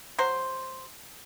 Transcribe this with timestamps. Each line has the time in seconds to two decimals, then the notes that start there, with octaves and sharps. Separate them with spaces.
0.19 F#3 C5